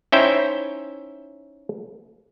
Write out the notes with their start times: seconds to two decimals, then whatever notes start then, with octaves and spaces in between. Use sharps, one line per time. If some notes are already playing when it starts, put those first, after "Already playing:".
0.12 C#4 D#4 E4 C5 E5 G5